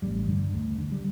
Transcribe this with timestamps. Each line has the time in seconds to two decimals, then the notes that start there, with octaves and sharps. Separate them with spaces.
0.02 A1 G3
0.28 G2 D3
0.53 D2
0.78 D3
0.92 G3